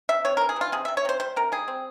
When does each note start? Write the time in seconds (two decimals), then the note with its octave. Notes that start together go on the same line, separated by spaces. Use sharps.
0.09 C3 E5
0.25 C3 C#5
0.37 A#4
0.41 E3
0.49 G#4
0.56 E3 F4
0.72 C3 G#4
0.85 C3 E5
0.97 C#5
1.05 C3 C5
1.20 G3 C5
1.36 C3 A#4
1.52 G3 G#4
1.68 C4